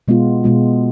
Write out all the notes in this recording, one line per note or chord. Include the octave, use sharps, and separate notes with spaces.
B2 G#3 B3 F4
B2 G#3 B3 F4